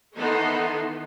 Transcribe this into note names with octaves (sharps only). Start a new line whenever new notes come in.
D#3 E3 B3 D#4 A4 C6